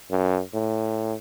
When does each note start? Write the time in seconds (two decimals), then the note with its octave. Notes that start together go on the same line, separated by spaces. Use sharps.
0.11 F#2
0.54 A2